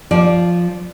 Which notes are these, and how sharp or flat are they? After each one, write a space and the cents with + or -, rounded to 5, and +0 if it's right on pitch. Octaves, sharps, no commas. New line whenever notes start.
F3 +0 D5 +0